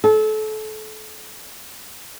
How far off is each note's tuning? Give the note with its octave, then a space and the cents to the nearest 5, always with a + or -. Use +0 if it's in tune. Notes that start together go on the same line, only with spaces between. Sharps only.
A4 -30